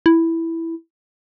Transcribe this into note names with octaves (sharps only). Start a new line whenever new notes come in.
E4